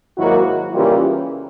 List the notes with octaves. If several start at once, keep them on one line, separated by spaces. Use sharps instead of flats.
G#2 D#3 F#3 A#3 E4 F#4
C#3 E3 G3 A#3 C#4 F4 G4